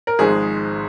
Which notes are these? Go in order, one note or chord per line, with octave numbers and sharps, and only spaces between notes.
A#4
G#1 G#2 F3 G#3 G#4